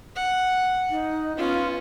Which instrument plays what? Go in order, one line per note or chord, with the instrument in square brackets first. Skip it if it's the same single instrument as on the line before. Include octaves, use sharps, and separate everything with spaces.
[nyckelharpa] F#5
[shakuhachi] D#4
[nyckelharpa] B3 C#4 [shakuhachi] F4